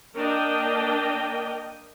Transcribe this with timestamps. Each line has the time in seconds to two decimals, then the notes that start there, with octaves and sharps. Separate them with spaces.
0.16 A#3 D4 A#4 D#5 G5